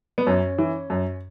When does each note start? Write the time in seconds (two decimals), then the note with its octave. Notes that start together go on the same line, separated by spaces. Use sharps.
0.18 B3
0.26 F#2 C#4
0.58 E3
0.90 F#2